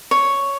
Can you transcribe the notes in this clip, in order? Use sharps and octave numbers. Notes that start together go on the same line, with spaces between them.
C#5